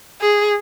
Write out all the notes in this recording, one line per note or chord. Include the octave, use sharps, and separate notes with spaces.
G#4